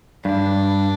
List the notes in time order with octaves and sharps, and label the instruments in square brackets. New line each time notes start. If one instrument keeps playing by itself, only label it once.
[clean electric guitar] G2 [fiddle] D4